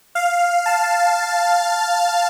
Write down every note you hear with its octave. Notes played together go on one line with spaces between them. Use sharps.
F5
A5